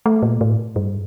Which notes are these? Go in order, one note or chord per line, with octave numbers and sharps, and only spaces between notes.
A3
A#2
A2
G2